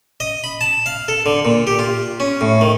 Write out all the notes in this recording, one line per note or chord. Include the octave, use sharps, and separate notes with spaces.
D#5
B5
A5
F5
A4
D3
A#2
G4
F4
C#4
A2
D#3